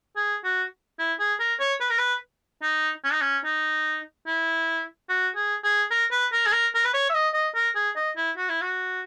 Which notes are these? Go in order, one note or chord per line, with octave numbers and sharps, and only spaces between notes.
G#4
F#4
E4
G#4
A#4
C#5
B4
A#4
B4
D#4
C#4
D#4
C#4
D#4
E4
F#4
G#4
G#4
A#4
B4
A#4
G#4
A#4
A#4
B4
C#5
E5
D#5
D#5
A#4
G#4
D#5
E4
F#4
E4
F#4